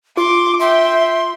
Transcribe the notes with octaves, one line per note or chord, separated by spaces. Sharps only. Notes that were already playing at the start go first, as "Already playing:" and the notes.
F4 C6 D6
E5 G5 C6